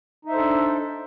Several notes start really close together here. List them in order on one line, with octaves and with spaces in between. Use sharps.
D#4 E5 C5 A4 D4